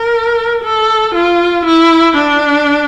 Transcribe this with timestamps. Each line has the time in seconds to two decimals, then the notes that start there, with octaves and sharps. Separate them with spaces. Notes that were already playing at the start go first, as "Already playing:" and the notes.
Already playing: A#4
0.63 A4
1.14 F4
1.65 E4
2.16 D4